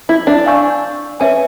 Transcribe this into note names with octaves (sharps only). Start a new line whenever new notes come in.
E4
D4
F5 G#5 C#6 E6 G6
C#4 B4 E5 G#5